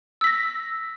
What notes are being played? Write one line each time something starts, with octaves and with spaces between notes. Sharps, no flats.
E6 A#6 B6